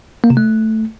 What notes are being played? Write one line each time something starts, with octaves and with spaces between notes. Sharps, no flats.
A#3
C3
A3